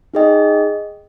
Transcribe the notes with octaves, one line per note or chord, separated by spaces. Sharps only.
D#4 G#4 D#5 G5